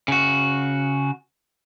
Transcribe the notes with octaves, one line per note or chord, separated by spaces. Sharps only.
C#3 F#4